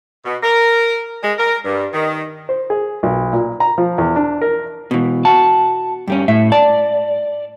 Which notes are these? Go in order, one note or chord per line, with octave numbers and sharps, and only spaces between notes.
B2
A#4
G#3
A#4
G2
D#3
C5
G#4
B1
A#2
A#5
F3
E2
D4
A#4
B2 E3
F#4 A5
G2 G3 C#4
A2 E5
D5 A5